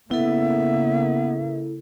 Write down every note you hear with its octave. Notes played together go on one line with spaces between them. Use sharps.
C#3 A#3 B3 E4 A4 E5